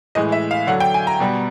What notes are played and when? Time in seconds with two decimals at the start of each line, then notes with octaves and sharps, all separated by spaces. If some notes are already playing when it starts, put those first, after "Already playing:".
0.15 A2 E3 G#3 D#5
0.32 E5
0.51 F5
0.67 D3 F#3 F#5
0.80 G5
0.94 G#5
1.07 A#5
1.20 B2 G3